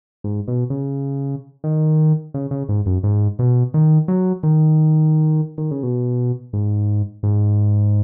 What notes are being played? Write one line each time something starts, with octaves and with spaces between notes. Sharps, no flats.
G#2
B2
C#3
D#3
C#3
C#3
G#2
F#2
G#2
B2
D#3
F#3
D#3
D#3
C#3
B2
G#2
G#2